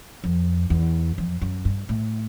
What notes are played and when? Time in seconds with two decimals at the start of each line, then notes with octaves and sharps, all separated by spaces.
0.24 F2
0.70 E2
1.18 F2
1.41 F#2
1.65 G2
1.89 A2